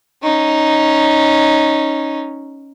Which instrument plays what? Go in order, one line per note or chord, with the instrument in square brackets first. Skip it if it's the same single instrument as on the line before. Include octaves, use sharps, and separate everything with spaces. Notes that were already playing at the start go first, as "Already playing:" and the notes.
[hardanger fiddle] C#4 D#4